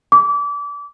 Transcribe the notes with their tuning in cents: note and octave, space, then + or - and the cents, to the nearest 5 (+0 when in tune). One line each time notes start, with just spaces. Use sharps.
D6 -30